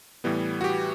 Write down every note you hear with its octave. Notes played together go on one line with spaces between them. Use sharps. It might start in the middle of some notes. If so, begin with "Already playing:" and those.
A2 E3 G3 B3
F#4
G4